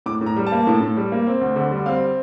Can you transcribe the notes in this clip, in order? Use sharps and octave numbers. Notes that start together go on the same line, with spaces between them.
A2 D6
A2
A#5
G3
A5
A#3
A2
A2
G3
A#3
C4
D2
D3
G3
C4 F5